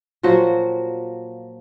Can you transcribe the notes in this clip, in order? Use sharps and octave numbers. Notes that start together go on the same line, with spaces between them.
A#2 F3 F#3 F#4